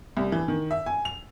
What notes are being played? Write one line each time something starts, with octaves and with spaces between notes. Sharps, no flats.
C2
E3
D#3
E5
G#5
F7